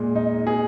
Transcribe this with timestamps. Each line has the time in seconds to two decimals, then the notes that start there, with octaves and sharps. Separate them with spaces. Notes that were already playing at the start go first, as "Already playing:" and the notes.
Already playing: A#2 G#3
0.15 D#4
0.47 G#4